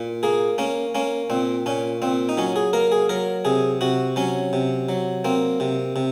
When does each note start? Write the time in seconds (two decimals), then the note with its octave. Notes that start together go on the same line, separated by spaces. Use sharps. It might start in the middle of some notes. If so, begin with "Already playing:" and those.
Already playing: A#2
0.23 A#3 G#4
0.58 A#3 C#4
0.95 A#3 C#4
1.30 A#2 C4
1.66 A#2 C#4
2.02 A#2 C4
2.29 D#4
2.37 F#3 C#4
2.56 G#4
2.73 A#3 A#4
2.92 G#4
3.09 F#3 A#4
3.45 C3 G#4
3.81 C3 F#4
4.16 F#3 C#4
4.53 C3
4.89 F#3
5.25 A#3 C4
5.60 C3
5.96 C3